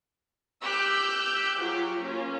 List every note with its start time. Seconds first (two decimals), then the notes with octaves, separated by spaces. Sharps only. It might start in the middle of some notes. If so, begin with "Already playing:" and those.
0.62 G4 D6 E6 F#6 G6
1.57 F#3 F4 G#4
2.00 A#3 C#4 F4